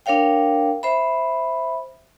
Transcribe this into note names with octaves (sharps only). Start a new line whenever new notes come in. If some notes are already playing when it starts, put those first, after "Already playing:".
D4 A#4 C#5 F5 G5
C5 E5 B5